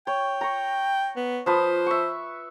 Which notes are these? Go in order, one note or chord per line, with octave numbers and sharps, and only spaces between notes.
C#5 G5
A#5 C#6
B3
F3 B4 C5 D#6
E5 C#6